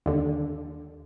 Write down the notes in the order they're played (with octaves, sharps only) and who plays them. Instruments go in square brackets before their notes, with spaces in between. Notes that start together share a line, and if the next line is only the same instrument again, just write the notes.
[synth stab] D#2 D3